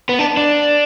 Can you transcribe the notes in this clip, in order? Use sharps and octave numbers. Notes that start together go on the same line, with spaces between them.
B3
D4
D4